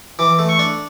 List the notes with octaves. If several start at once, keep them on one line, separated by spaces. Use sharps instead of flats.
E3 D6
A3
C#6
D4